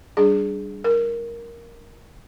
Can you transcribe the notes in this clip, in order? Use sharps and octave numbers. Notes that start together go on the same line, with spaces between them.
G3 D4 G#4
A#4